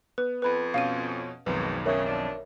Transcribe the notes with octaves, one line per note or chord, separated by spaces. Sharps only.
B3 B4
F2 B4 B5
B2 C#4 F5 D#7
B1 F2 G#2 D#3 B4
C#3 A#4 C#5 E5
F3 D4